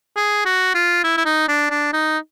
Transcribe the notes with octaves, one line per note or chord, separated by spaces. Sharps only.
G#4
F#4
F4
E4
E4
D#4
D4
D4
D#4